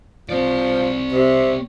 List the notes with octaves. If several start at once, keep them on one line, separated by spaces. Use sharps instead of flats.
F3 C4 D5
C3